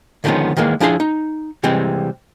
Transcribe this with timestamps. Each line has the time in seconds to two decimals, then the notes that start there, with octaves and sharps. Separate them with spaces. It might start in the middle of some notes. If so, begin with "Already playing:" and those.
0.24 D3 D#3 F3 G#3 B3 C#4
0.57 D#3 E3 G#3 A#3
0.80 F3 D4 E4 G#4 G5 C6
1.00 D#4
1.63 C3 E3 G3 G#3 C4